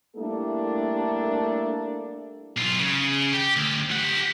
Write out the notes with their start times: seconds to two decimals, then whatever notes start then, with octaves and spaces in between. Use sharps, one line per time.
0.16 G3 A3 A#3 D4 E4 A4
2.57 B1 F4
2.79 C#3
3.33 G4
3.56 D2
3.91 G4 F#5